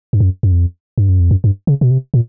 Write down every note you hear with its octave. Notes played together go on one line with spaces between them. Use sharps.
G2
F#2
F#2
F2
G2
F#2
F2
F#2
G2
C#3
B2
C3
A#2